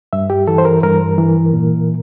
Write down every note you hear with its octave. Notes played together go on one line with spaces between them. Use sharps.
G2 E5
G4
E3 A4
C5
A#4
G2 A#4
E3
A#2